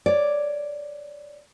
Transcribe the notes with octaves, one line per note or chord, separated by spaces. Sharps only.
C#5 D5